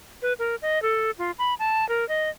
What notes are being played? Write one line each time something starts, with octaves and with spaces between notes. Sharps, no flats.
B4
A#4
D#5
A4
F4
B5
A5
A#4
D#5